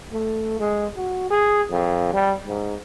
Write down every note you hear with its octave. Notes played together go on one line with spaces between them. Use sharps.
A3
G#3
F#4
G#4
F2
G3
G#2